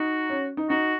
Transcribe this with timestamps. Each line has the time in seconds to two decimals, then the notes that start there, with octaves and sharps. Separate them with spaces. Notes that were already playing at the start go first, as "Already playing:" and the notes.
Already playing: D#4 F#4
0.30 C#4
0.57 D#4
0.70 D#4 F#4